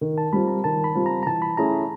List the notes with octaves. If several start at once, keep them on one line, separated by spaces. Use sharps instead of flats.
D#3
A5
G3 C4 F4 B5
A#5
D#3 A5
B5
G3 C4 F4
A#5
A#5
E3 A5
B5
A3 C#4 E4 G#4 A#5